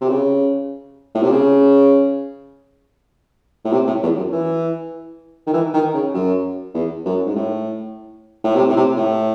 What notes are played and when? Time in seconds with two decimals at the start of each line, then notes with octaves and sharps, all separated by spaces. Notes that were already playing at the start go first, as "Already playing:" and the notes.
0.01 C3
0.09 C#3
1.15 A2
1.23 C3
1.30 C#3
3.65 A2
3.73 C3
3.87 A2
4.03 E2
4.18 F#2
4.32 E3
5.47 D#3
5.54 E3
5.74 D#3
5.94 C#3
6.14 F#2
6.74 E2
7.05 F#2
7.26 G#2
7.36 A2
8.44 A2
8.56 C3
8.69 A2
8.76 C3
8.96 A2